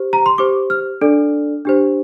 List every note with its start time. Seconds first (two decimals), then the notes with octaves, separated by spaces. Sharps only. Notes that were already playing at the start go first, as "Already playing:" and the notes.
Already playing: G4 C5
0.13 A#5
0.26 C6
0.38 G4 C5 D6
0.70 F6
1.01 D4 A4 D5
1.65 D4 G4 C5